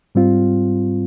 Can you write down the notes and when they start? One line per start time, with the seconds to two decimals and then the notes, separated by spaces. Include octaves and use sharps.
0.15 G#2 G3 C4 F4